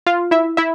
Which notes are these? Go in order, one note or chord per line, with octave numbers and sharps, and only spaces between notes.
F4 F5
E4 E5
E4 E5